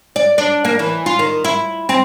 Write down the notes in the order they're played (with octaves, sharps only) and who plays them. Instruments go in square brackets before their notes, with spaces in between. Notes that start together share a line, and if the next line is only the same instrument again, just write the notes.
[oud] D5
D4
A#3
E3
F4
D#3
E4
C4